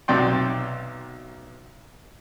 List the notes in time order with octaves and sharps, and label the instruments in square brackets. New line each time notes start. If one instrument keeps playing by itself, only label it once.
[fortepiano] B1 C3 F#3 D5 G5 C6